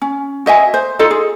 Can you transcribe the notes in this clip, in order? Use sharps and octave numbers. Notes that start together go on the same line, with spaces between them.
C#4
F#4 D#5 E5 G#5
C5
D#4 F4 A4 D#5
G#4